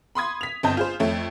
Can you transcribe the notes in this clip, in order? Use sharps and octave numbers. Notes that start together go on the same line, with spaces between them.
B5 C6 D#6 G#6
B6 F7
G1 C4 D#5 A5 G6
F4 G#4 C5
F2 A3 C#5